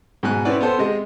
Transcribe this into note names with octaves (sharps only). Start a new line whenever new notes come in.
G#2 B2 G#5 F#6
C4 C#4 E4 F#4 B4 D5
B3 A4 C5
C3 G#3 D#5